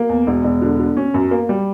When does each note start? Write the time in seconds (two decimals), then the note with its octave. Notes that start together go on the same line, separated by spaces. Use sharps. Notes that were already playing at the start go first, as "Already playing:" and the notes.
Already playing: A#3
0.09 E2
0.27 E1
0.44 E1
0.62 D3
0.79 D3
0.97 C#4
1.14 F#2
1.31 A#3
1.49 G3